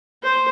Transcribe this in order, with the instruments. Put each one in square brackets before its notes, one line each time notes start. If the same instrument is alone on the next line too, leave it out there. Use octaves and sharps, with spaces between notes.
[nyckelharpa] C5